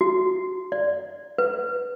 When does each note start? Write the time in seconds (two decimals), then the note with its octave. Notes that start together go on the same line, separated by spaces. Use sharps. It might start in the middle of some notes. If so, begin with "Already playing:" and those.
0.01 F#4
0.72 D5
1.38 B4